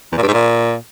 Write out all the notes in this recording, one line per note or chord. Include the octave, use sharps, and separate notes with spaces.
E2
A#2
G2
G#2
A#2